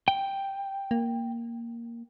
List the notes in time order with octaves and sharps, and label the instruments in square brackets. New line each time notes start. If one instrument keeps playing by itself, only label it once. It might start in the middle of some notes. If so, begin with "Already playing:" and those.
[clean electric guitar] G5
[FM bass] A#3